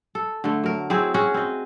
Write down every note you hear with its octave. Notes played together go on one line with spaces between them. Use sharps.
A4
D3 A3
F#3 A#4
F#3 C4 E4 G#4
C#4 F#4 G#4
C4 D#5